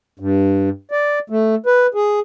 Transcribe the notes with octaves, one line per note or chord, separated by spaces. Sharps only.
G2
D5
A3
B4
G#4